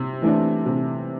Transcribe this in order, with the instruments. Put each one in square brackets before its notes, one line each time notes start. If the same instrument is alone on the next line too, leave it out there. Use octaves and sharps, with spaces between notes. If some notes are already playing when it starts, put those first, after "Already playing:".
Already playing: [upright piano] C3
E3 A3 D4
C3